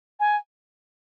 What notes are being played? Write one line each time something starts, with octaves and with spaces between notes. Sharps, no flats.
G#5